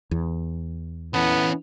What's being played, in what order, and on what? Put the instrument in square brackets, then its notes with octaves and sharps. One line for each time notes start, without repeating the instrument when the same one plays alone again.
[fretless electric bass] E2
[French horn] E3 [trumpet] B3 [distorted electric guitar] C#4 A4